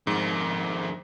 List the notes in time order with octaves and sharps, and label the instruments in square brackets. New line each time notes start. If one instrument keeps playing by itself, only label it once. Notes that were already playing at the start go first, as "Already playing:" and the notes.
[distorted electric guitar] F2 D#3 [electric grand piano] G#2